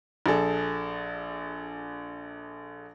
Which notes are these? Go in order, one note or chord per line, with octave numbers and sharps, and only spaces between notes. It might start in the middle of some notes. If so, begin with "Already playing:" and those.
A#1 G#4 A4